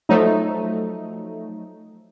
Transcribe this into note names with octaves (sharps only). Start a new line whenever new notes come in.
F3 F#3 A3 D#4